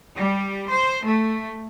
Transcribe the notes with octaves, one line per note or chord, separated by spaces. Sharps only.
G3
C5
A3